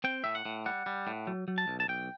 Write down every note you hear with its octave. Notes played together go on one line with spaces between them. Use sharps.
C4 G5
A2 E5
F#5
A2
G3 F#5
G3
A2
F#3
F#3
A5
B1
A5
B1 G5